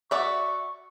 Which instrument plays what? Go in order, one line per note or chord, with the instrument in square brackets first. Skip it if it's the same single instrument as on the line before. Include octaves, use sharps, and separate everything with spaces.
[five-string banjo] F#4 D5 E5 [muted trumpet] C#6